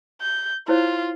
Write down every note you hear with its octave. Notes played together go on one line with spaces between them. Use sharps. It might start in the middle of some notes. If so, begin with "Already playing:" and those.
G6
E4 F4 C5 C#5